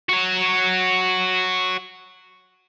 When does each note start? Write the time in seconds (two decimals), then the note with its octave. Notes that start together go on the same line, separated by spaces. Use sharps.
0.09 F#4 C#5